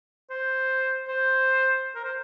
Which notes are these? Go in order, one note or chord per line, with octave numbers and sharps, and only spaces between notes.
C5
C5
A#4
C5